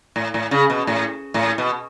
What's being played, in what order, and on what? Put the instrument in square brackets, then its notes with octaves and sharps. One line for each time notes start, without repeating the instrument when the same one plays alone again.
[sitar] A2
A2
C#3
B2
A2
A2
B2